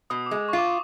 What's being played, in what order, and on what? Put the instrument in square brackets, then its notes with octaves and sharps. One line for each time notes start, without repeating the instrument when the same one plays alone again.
[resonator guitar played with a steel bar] B2 [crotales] D#6
[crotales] D6
[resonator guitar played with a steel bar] G#3
[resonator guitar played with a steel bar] F4 [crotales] C#6
[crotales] D6